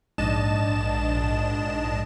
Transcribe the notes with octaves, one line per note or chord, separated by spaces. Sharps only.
A#1 G#2 D4 D#5 A5 E7